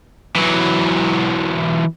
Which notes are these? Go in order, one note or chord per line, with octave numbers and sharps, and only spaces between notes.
E3 F#3